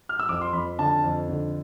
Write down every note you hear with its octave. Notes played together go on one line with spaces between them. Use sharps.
F6
E6
F2 D6
C6
F2 B5
D3 A5
F2
D3